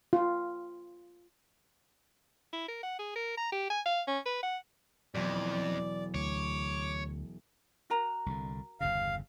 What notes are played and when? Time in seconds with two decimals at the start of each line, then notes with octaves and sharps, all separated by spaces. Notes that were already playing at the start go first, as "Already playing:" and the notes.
0.13 F4
2.53 E4
2.68 A#4
2.83 F#5
2.99 G#4
3.16 A#4
3.37 A#5
3.52 G4
3.70 G#5
3.86 F5
4.07 C#4
4.26 B4
4.43 F#5
5.15 E1 F2 F#3 B3 D5
6.14 D2 C#5 D6
7.90 F#4 A#4 A#5
8.26 C2 D3
8.80 G1 E2 C#3 F5